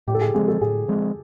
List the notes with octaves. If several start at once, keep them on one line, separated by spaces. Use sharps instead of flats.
A2 G4
A4
G#4
F3 G#3 C4 G#4
A4
A2 G#4
F3 G#3 C4